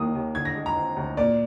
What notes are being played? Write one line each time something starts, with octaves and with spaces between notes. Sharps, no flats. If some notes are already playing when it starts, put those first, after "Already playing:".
Already playing: D#2 D#3 A#3 D#6
D#2
D3 G#6
A#6
G#3
A#5
C4
D2
A#2 D5